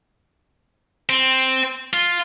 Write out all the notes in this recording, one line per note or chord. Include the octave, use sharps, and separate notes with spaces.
C4
F4